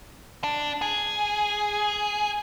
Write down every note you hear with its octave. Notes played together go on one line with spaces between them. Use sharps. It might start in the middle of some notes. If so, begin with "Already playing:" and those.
D4
G#4